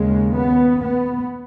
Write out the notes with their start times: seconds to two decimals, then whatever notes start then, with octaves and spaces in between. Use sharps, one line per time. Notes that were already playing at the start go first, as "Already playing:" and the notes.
Already playing: D#2 C#3 G#3
0.35 B3
0.81 B3